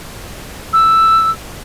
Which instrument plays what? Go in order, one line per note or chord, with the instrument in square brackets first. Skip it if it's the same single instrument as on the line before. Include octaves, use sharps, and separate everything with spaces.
[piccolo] E6